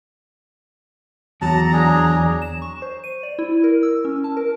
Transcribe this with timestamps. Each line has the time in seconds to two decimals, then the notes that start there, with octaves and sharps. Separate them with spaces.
1.42 E2 F#3 A5 A#5
1.73 D4 G#4
2.42 E7
2.62 C#6
2.82 C5
3.04 D#7
3.23 D5
3.39 E4
3.64 A#4
3.83 E6
4.05 C#4
4.24 A5
4.37 A#4